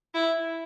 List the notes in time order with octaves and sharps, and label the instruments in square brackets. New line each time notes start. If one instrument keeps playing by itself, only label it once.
[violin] E4